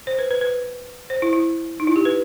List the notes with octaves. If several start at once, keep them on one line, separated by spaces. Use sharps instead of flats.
C5
B4
B4
B4
C5
E4
E4
D#4
E4
G4
B4